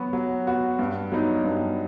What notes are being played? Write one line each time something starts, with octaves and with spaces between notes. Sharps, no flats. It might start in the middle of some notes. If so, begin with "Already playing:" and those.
Already playing: F#3 B3 F#4
F#3
B3 F#4
G2
F#3 B3 D#4
G2